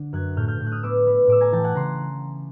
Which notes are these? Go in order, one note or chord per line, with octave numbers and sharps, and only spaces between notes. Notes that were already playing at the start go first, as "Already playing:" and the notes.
Already playing: D3
F#2 F#6 G#6
A2 F6 G6
F6 G6
A2
F#6
D#6 F6
B3 D6 E6
B3
A2 D6 E6
G#5 A#5
E3 G5 A5
F#5 G#5
C#3 A#5 C6